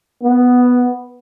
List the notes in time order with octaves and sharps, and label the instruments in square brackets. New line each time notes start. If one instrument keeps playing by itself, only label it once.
[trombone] B3